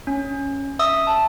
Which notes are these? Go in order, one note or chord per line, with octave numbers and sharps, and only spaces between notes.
C#4
E5 D#6 E6
A5